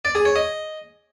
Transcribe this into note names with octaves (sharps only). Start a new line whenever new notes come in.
D5
G#4
C#5
D#5